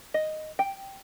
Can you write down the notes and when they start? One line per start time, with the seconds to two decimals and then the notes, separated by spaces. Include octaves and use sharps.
0.14 D#5
0.59 G5